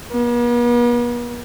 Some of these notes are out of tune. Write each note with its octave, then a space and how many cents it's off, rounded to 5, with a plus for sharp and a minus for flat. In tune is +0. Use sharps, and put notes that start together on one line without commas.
B3 -45